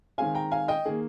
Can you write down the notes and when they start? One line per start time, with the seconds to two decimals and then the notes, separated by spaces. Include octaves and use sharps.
0.18 D#3 G#3 C4 F5 G#5
0.35 G5 A#5
0.51 F5 G#5
0.68 D#5 G5
0.85 D#3 A#3 G#4